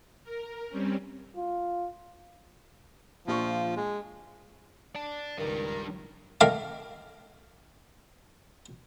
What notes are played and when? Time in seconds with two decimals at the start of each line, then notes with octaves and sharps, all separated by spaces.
0.24 A#4
0.69 G3 C4 C#4
1.36 F4
3.28 A#1 F3 F4 C#6
3.76 G#3
4.95 D5 A5
5.38 C#2 D#3 G3 D4 A#4
6.41 D#3 A3 F5 A5 D6